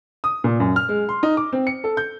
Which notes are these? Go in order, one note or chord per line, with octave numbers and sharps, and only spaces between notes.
D#6
A#2
F#2
F6
G#3
C6
D#4
D6
C4
C#7
A4
G6